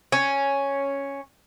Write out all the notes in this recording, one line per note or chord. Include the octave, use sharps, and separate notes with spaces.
C#4